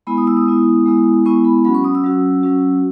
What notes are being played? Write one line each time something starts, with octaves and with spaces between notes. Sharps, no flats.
G#3 B3 E4 B5
D#6
E6
D#6
G#3 B3 E4
G#3 B3 E4
G#3 B3 E4 C#6
B5
F#3 C#4 F#4 B5
C#6
D#6
E6
F#3 C#4 F#4
F#3 C#4 F#4